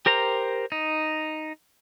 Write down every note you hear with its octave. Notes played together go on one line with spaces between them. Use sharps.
G4 A#4 C5 A#5
D#4